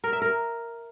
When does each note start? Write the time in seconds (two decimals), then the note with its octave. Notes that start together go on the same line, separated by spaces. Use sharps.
0.04 A#4
0.13 E5
0.22 A#4